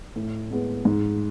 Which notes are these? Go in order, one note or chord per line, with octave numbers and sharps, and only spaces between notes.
A2
G#3 B3
G#2